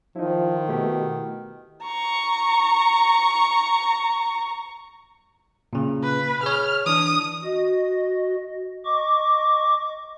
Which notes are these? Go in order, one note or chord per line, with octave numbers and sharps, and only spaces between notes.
D#3 F3 D#4 E4
B2 A3 E4 G4
A#5 C#6
A#2 C#3
B4
G#4 C#5 F6
E3 D4 D#6
F#4 D#5
D#5 C#6 D6